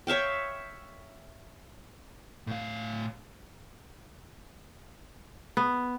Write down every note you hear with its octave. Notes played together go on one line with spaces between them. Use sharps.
C#5 E5 F5 G5
A2 F5
B3